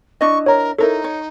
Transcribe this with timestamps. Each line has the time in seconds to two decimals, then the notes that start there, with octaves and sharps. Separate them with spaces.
0.21 D4 E4 D#5 C#6
0.46 A#4 C#5 A#5
0.79 D#4 E4 A4 A#4 C#5
1.04 C#5